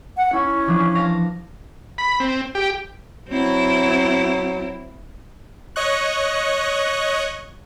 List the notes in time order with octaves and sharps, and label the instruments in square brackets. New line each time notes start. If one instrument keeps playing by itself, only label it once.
[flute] F#5
[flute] C#4 [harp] E4
[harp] E3 F3 D4
F5 A5 A#6
[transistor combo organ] B5
C4
G4
[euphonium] F#3 [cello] C4 E4
[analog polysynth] C#5 D#5 C#6 F#6